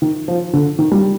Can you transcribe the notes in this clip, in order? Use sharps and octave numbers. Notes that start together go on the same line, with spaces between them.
D#3
F3
D3
D#3
G3